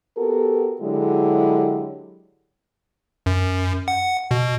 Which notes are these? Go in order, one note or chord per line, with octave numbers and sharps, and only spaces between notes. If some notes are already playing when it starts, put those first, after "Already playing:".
B3 F#4 G4 A4 A#4
D3 F#3 G#3 E4 G4
F#2
F#5
B2